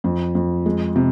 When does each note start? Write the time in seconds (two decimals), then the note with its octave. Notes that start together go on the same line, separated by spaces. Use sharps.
0.04 F2
0.35 F2
0.66 G#3
0.96 C3